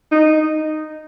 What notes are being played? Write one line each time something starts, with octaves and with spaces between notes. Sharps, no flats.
D#4